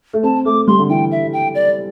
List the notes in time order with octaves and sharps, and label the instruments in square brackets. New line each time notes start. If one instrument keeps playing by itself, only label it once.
[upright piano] A3
[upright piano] C4 [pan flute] A5
[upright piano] A3 [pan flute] D6
[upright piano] G3 [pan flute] C6
[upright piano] D3
[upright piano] E3 [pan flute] G5
[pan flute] E5
G5
D5